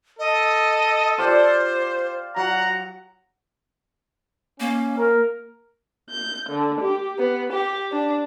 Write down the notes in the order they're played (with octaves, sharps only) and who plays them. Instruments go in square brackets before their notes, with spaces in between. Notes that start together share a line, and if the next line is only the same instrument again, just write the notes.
[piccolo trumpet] A4 [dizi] D#5
[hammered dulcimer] F4 G4 D5 [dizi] C5
[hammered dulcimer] F#3 [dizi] F#5 [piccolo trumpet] A#5
[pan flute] A#3 [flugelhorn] C#4
[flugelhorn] A#4
[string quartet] G6
D3
G4
B3
G4
D4